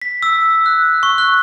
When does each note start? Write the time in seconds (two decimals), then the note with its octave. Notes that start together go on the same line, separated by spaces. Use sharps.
0.02 B6
0.23 E6
0.66 F#6
1.03 C#6
1.18 F#6